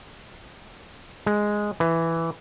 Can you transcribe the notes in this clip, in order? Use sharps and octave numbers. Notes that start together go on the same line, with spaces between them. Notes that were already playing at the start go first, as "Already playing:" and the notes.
G#3
E3